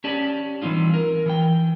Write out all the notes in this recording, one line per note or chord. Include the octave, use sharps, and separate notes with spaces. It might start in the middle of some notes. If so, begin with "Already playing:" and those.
C#4 G4 D5 A5
E3 G3 C4 D#4 F4
A#4
E3 G5